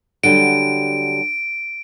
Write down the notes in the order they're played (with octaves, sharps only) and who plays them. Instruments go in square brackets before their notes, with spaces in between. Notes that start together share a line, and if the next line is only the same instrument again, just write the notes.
[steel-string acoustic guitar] D3 F#3 G3 [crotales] D7